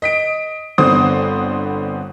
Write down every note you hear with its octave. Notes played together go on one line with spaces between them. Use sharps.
D#5 B6 D7
G1 D3 B3 C4 C5 D#6